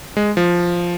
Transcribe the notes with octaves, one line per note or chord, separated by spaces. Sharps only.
G#3
F3